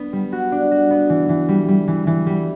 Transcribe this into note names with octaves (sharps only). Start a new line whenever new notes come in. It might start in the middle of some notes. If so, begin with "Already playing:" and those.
Already playing: B3 D4
G3
F#4
D4
F#4
B3
E3
E3
G3
G3
E3
E3
G3